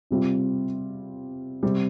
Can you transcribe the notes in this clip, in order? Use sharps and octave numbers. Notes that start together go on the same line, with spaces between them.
C3 G3 C4 F4
C3 G3 C4